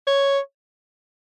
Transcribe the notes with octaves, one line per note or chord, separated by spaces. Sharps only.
C#5